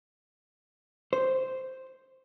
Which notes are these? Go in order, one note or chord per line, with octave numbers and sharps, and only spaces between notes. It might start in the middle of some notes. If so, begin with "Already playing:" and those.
C5